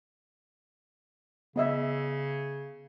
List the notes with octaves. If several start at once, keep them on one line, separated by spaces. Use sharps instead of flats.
C#3 B3 D#5 E5